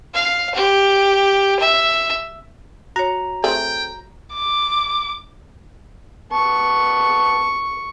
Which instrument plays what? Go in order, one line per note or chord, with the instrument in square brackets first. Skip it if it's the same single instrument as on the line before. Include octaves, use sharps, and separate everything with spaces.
[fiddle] F5
G4
E5
[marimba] F#4 C#5 [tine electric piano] A#5
[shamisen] A3 C4 G#4 [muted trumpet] G5
[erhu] D6
[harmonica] B3 A5 [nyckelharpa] C#6